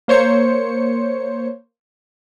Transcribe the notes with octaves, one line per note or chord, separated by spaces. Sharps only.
A#3 C5 C#5 C#7